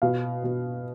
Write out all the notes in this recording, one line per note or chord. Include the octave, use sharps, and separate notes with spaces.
B2 F5
B2